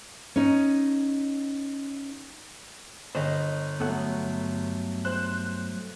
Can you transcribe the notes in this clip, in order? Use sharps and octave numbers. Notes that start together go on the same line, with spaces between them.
C#4 D#4
G1 C5 D#5
G2 F#3 A3 B3 A4 F#5
C5 F#6